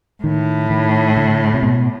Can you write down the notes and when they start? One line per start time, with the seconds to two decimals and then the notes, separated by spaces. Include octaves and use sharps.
0.23 A2 D#3
0.70 D#3
1.17 D3
1.54 C3
1.63 B2